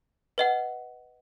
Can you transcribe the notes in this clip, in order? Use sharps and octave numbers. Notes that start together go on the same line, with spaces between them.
B4 D#5 F#5